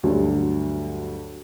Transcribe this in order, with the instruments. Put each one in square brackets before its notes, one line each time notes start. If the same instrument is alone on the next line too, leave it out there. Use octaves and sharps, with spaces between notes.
[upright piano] D2 G2 F#3